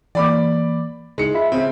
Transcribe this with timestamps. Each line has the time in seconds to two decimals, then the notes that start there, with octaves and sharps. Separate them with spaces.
0.15 E3 A#3 D5 B5 D6
1.18 C#3 G#3 D#4 E4 C#7
1.34 F4 E5 B5 B6
1.52 C#3 C4